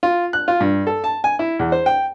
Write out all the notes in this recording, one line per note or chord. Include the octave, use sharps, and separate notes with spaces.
F4
F#6
F4
G2
A4
A5
G#5
E4
E2
C5
G5